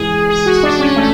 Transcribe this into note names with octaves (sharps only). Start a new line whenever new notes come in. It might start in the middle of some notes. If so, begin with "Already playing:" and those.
Already playing: E3 G#3 G#4
G#4
F#4
D4
C#4
A3